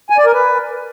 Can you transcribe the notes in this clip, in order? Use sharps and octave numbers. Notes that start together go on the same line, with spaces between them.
G#5
D5
A#4
B4